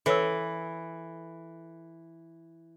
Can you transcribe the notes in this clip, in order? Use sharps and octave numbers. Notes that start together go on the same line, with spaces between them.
E3 A4 B4 C#5 E6